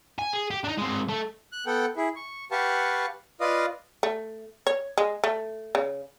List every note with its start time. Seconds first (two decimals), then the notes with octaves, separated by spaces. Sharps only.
0.19 G#5
0.33 G#4
0.50 G4
0.64 D4 D#4
0.78 G#3 C4
1.09 A3
1.52 F#6
1.67 B3 A4 F#5 G5
1.97 E4 G#4
2.16 C#6
2.51 G4 B4 F5 F#5 A5 C#6
3.41 F4 B4 D5 D#5 F5 D#6
4.03 A3
4.67 C#5
4.98 G#3
5.24 A3
5.75 C#3